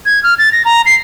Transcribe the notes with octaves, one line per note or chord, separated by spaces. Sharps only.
G#6
F6
A6
A#6
A#5
C7